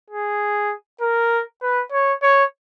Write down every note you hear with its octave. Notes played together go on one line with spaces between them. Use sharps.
G#4
A#4
B4
C#5
C#5